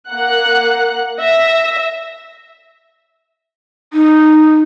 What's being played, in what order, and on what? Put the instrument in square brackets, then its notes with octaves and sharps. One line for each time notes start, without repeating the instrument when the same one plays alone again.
[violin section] A#3 F#5 F#6
E5 A#6
[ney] D#4